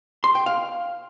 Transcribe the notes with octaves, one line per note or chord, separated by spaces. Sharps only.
C6
G5
F5